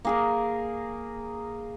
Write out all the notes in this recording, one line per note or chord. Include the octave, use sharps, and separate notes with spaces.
A#3 G#4 A#4